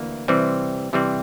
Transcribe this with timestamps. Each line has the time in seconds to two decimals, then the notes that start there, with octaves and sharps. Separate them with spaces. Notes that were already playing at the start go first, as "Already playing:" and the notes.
Already playing: D2 E3 A#3
0.28 C3 E3 G3 C4
0.93 C3 E3 G3 C4